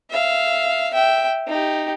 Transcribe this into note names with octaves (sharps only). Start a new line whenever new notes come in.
E5 F5
E5 G5
D#4 G4